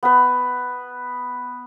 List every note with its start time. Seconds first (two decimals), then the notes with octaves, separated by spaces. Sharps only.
0.03 B3 B4